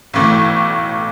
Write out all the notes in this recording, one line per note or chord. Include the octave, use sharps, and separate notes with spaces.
B1 A2 E3 A3